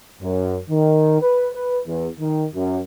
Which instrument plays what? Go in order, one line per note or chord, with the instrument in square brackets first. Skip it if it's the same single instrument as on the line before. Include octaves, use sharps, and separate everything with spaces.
[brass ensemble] F#2
D#3
B4
B4
E2
D#3
F#2